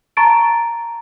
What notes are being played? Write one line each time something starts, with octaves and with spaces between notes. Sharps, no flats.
A5 A#5 C#6 A6 D7